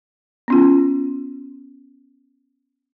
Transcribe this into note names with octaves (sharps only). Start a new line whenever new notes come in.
B3 C#4 F4